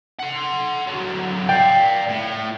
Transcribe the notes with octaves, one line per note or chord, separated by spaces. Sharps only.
F#5 C6
D3 F#3
D5 F5 G5
A2